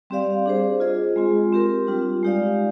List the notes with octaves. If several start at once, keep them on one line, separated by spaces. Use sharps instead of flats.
G3 C4 G4 D5 F5
D4 G#4 C5
F4 G#4 D#5
G#3 C4 F4
C4 G4 A#4
G3 D4 F4
G#3 D#4 G4 D5 F5